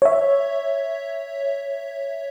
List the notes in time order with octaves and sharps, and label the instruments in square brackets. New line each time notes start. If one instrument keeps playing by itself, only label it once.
[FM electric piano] C#5 E5